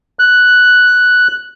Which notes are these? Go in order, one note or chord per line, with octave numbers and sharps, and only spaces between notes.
F#6